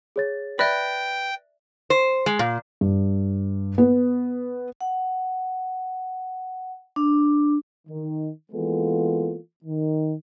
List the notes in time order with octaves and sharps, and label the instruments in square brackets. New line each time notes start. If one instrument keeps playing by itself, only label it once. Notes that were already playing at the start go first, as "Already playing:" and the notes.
[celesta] G#4 C#5 A6
[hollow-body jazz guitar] B4 [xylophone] D5 E5 [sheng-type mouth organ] G5 [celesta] F#6 A6 A#6
[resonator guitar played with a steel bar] C5
G#3
A#2
[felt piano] G2
B3
[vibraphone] F#5
D4
[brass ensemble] D#3
E3 G#3 A#3 B3 F4 A4
D#3